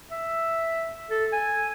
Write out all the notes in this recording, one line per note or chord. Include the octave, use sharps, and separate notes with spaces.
E5
A4
G#5